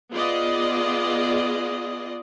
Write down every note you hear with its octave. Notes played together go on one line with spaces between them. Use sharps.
B3 F4 G#4 D5 D#5